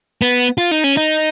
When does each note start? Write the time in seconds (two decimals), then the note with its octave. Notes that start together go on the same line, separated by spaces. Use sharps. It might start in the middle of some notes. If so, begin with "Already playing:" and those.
0.22 B3
0.58 F4
0.71 D#4
0.84 C#4
0.97 D#4